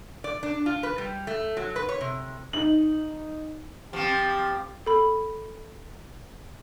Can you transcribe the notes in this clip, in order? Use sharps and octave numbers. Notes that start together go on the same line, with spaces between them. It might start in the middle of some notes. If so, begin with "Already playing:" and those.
D5
D4
F4
B4
G3
A3
F#3
B4
C#5
C3
D#4 F#7
F3 C4 G4
A4 B5